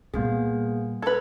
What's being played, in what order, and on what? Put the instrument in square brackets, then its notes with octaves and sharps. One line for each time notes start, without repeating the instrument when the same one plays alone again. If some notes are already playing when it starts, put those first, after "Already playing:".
[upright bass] A#2 G3 [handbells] A#3 B3 G#4
[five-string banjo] A4 B4 [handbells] A#5 G#6